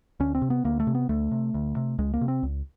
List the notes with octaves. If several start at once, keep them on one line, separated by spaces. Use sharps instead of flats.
D2 C#4
C4
C3
B3
D2 A#3
A3
C3
B3
D2 A3
C3
D2
C3
C#2 G#3
A#3
C3
C4
C#2